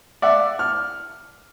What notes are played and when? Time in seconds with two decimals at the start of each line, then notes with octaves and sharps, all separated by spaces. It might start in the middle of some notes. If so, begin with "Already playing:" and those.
0.22 D5 E5 F#5
0.59 F6